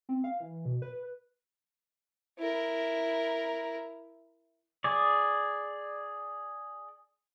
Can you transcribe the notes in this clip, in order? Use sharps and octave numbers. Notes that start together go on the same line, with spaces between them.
C4
F5
E3
B2
B4
E4 A#4
G#4 D5